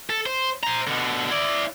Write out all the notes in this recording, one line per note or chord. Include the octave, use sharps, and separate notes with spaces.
A4
C5
C5 A#5
B2 D3
E4 D5